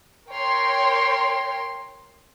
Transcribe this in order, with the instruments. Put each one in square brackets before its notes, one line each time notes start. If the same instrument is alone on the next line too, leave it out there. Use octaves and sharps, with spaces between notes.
[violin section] A#4 C#5 G5 C6